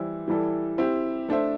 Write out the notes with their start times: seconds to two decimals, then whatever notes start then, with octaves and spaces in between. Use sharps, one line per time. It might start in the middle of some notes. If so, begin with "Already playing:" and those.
Already playing: E3 G3 E4 G4 C5
0.28 E3 G3 E4 A4
0.78 C4 E4 G4
1.29 A3 D4 C5 E5